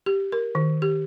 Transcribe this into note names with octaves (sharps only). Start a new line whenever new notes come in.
G4
A#4
D#3
G4